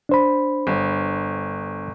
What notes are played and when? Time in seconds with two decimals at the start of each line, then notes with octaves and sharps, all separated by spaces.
0.09 D4 C5 B5
0.67 G1